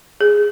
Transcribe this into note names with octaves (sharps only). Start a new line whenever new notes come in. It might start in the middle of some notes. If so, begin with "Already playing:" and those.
G#4